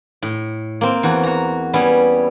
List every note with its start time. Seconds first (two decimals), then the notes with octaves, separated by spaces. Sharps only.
0.23 A2
0.81 A#3 C4
1.03 E2 F#4
1.23 F#4 A#5
1.73 G3 B3 C#4 E4